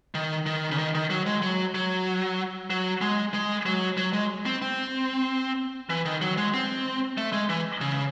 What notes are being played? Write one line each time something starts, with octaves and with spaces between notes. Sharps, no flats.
D#3
D#3
C#3
D#3
D#3
F#3
G#3
F#3
F#3
F#3
G#3
G#3
F#3
F#3
G#3
C4
C4
E3
D#3
F#3
G#3
C4
A3
G#3
E3
C#3